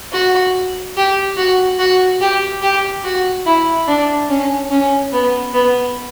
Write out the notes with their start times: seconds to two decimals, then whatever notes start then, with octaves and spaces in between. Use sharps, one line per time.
0.12 F#4
0.97 G4
1.37 F#4
1.79 F#4
2.21 G4
2.62 G4
3.04 F#4
3.46 E4
3.88 D4
4.29 C#4
4.71 C#4
5.12 B3
5.54 B3